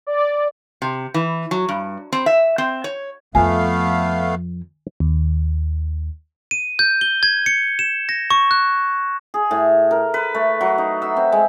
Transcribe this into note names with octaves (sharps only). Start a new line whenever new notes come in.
D5
C3
E3
F#3
G2
C4
E5
C4
C#5
F2 F3 A3 B3 F5 G#5
D#2
D#7
G6
G7
G#6
C#7
E7
A#6
C#6
F#6
G#4
A2
A#4
B4
A3
F#3
D#4
E5
C4
G#3